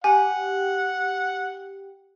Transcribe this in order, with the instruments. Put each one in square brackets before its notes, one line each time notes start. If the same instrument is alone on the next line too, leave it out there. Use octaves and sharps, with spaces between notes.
[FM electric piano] G4 [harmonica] F#5 [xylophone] G#5